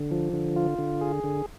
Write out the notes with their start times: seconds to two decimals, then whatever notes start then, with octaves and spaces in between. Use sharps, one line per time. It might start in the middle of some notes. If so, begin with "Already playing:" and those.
Already playing: D3
0.11 F3
0.33 D3
0.56 F4
0.79 D3
1.01 G#4
1.24 D3